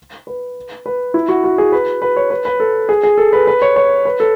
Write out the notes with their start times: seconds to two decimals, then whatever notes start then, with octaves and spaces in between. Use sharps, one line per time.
0.27 B4
0.86 B4
1.14 E4
1.29 F#4
1.44 F#4
1.58 G#4
1.72 B4
2.02 B4
2.16 C#5
2.30 B4
2.45 B4
2.60 A4
2.89 G#4
3.03 G#4
3.18 A4
3.33 B4
3.47 B4
3.62 C#5
3.76 C#5
4.05 B4
4.20 A4